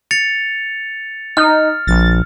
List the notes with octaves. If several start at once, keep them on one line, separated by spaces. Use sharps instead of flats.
A6 C#7 F7
D#4 F6
A#1 A6